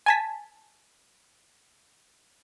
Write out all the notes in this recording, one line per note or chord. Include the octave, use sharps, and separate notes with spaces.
G#5 A5 B6